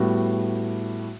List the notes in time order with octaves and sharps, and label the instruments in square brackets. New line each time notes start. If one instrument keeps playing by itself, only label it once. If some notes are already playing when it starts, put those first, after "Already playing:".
Already playing: [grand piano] A2 G3 B3 F#4